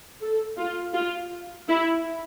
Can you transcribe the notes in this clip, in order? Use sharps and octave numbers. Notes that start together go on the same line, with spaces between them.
A4
F4
F4
E4